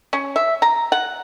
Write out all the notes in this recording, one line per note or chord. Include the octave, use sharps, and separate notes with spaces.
C#4
E5
A#5
F#5